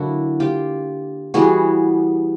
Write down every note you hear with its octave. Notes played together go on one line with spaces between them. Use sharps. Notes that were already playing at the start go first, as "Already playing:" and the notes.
Already playing: D3 F#3 A#3 D4 E4 F#4
F4 G4
E3 G3 B3 F#4 G#4